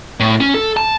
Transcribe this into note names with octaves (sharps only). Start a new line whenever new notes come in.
A2
C#4
A4
A5